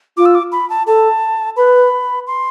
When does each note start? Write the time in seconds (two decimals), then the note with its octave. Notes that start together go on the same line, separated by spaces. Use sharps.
0.17 F4 D6
0.26 E6
0.35 D6
0.52 B5
0.70 A5
0.87 A4 A5
1.57 B4 B5
2.27 C6